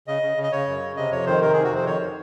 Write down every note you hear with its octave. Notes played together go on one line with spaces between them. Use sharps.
C#3 D#5
C#3
C#3
D#5
C#3 C#5
F#2
C#3
C3 D#5
F2 C#5
D#3 C5
C3 A#4
C3 G#4
F#4
F2 C5
D#3 C#5
D#3